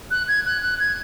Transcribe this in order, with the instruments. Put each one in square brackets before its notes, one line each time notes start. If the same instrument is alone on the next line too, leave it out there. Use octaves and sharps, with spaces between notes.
[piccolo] F#6
G#6
F#6
F#6
G#6